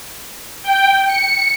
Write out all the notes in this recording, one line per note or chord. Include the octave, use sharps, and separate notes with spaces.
G5
C#7